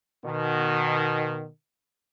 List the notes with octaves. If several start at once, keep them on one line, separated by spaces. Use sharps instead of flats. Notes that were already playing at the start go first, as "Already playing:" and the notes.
B2 D#3